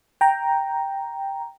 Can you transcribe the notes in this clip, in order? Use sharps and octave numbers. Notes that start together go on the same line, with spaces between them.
G5 A#5